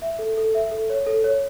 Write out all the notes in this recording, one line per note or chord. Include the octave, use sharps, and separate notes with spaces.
E5
A4
A4
E5
A4
C#5
A4
C#5